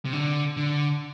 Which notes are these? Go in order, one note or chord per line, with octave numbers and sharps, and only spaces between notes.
C3
D3
D3